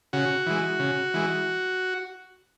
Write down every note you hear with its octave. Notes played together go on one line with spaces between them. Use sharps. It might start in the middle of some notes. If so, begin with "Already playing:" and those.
C#3 F#4
E3 G#3
C#3
E3 G#3